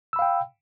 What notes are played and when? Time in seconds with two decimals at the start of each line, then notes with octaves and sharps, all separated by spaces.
0.13 E6
0.16 B5
0.19 F5
0.22 G5